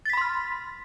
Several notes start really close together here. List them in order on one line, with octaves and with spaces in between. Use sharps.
A6 B6 B5 C6 F6